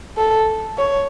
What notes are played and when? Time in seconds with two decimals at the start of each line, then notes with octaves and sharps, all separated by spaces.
0.18 A4
0.78 C#5